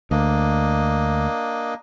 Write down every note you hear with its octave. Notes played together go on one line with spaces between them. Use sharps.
D2 A#3 D4 D#5